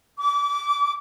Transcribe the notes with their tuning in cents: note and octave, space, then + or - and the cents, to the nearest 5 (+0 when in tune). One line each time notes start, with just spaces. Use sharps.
D6 -25